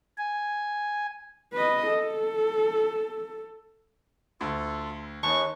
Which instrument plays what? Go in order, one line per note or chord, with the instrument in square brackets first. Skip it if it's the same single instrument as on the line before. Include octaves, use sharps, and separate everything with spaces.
[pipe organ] G#5
[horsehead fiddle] B4 D#5
A4
[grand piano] D2 [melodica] F4 A4
[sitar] D#2 [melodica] C#4 B4 [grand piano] A5 [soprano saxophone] C#6